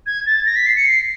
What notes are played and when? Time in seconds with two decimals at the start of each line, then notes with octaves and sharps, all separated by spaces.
0.06 G#6
0.26 A6
0.46 A#6
0.56 B6
0.66 C7
0.76 C#7
0.86 C7